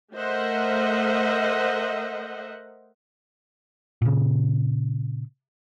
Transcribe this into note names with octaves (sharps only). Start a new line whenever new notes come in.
A3 A#4 C5 D#5 E5 F#5
A#2 C#3